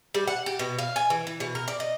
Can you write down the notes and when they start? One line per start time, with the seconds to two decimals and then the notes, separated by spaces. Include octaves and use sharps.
0.14 G3
0.28 F#5
0.46 G4
0.59 B2
0.79 F5
0.96 G#5
1.10 E3
1.27 E3
1.40 B2
1.55 A#4
1.68 D5
1.80 D#5